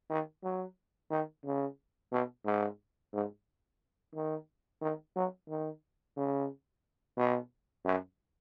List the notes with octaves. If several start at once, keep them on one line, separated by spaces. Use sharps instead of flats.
D#3
F#3
D#3
C#3
B2
G#2
G#2
D#3
D#3
F#3
D#3
C#3
B2
F#2